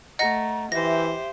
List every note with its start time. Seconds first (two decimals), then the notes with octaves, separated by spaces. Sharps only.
0.19 A3 D#5 F#5 A#5 A#6
0.72 E3 G4 C5 E5 A#6